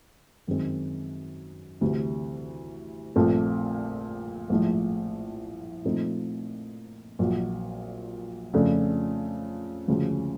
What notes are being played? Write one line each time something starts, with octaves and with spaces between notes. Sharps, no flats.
F#2 D#3 G#3 C4
D2 C3 E3
A#1 A#2 F3 A3 C4
A#1 A2 F3 G#3
A#2 F3 A3 C4 D#4
A#1 A#2 F#3
F2 C#3 F3 A3 D4
D2 C#3 F3 G#3